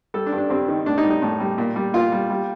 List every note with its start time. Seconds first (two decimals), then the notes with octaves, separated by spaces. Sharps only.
0.14 G3 A4
0.26 D4
0.32 G2
0.38 D4
0.50 G2 C4
0.68 D#3
0.86 A2 D4
0.98 D#4
1.04 G3
1.10 D#4
1.22 A2
1.40 G3
1.58 A#2
1.76 G3
1.94 A#2 F4
2.12 G3
2.30 G3